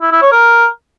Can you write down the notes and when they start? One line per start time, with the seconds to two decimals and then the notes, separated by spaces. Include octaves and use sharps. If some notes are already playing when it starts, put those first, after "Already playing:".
0.02 E4
0.12 E4
0.22 C#5
0.32 A#4